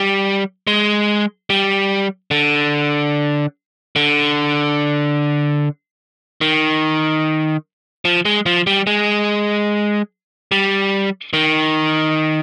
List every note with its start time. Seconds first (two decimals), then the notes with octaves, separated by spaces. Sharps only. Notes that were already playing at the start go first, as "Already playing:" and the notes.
Already playing: G3
0.67 G#3
1.50 G3
2.31 D3
3.96 D3
6.41 D#3
8.05 F3
8.25 G#3
8.46 F3
8.67 G3
8.87 G#3
10.52 G3
11.33 D#3